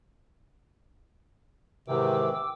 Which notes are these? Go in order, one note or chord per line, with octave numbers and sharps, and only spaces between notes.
G#2 C3 D#3 E3 G5 D6 E6